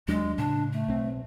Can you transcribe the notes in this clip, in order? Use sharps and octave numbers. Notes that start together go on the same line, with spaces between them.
D#2 F#3 G#3 D4
A2 C#3 D4
A3
B1 C4